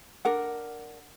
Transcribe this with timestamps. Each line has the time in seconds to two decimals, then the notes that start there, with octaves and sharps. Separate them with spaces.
0.25 D4 A#4 F#5